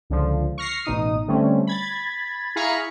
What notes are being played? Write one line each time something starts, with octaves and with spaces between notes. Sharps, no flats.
C#2 D3 F3
C#6 F6 A#6 C7
A1 B2 D#4 D#6
D3 G3 A3 C4 C#4
B5 G#6 A6
E4 G#4 F5 A#5 B5 C#6